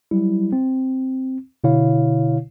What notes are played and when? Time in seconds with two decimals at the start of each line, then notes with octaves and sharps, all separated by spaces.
0.11 F#3 G3 E4
0.53 C4
1.64 B2 D3 E4 C#5 F5